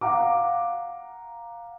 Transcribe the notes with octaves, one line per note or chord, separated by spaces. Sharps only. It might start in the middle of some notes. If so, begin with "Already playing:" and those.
F5 F#5 A#5 D6